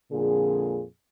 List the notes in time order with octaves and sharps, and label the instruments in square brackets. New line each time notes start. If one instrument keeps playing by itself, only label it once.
[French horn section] F2 A#2 D3 G#4